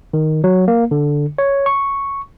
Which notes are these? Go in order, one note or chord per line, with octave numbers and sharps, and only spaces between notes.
D#3
F#3
A#3
D3
C#5
C#6